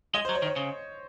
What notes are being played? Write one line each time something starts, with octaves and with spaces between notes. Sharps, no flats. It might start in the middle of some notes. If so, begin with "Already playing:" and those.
G#3 D#5
C5
F#3
C#5
D#3
C#5
C#3